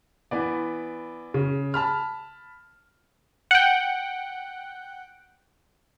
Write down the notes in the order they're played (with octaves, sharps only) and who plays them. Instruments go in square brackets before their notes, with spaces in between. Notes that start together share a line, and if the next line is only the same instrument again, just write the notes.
[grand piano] E3 B3 D5
C#3
A5 B5 F6
[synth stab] F#5 G5